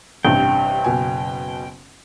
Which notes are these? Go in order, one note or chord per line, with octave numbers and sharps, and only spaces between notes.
A1 G2 C3 G5
F#1 B2 G#5